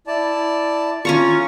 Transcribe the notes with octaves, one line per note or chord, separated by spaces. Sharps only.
E4 D5 A5
C#4 F4 A#5 C#6